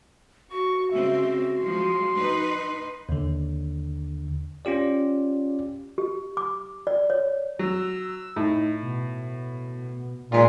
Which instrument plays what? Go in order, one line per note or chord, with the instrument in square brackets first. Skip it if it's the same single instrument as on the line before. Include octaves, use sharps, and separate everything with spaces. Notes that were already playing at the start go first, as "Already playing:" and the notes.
[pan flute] F#4 [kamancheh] C#6
[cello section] C#3 G#3 C4 [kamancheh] E5
[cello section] F3 G#3 [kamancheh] C6
[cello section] D#4 B4
[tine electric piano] D#2 D3
C#4 F4 G4 D5
[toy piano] G4
D6
D5
C#5
[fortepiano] F#3 [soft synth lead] E6
[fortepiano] A2 [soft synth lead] D#4
[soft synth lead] B2
[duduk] A#2 [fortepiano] G#3 F4 [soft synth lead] B6